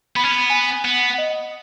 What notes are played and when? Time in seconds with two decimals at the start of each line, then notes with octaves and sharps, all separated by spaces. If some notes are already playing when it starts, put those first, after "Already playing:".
0.16 B3 B5
0.24 C#4
0.32 B3
0.50 G#5
0.84 B3 F#5
1.18 D#5